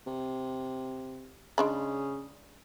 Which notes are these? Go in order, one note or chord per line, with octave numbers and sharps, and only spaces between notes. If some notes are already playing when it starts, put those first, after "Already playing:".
C3
C#3 G#3 D4 B5